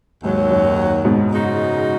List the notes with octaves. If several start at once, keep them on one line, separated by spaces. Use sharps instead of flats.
D#2 G#2 D#3 F#3
F#2
G#2 B2
C#3 G#3 D#4 F#4